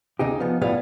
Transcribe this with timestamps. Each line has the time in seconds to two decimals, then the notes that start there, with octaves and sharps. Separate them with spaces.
0.19 D2 C#3 D#4 G4
0.40 F3 B3
0.61 B1 A2 G3 B3 F5